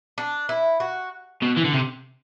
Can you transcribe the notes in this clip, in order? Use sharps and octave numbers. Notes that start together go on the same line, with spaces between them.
D4
E4
F#4
B2
E3
D3
C3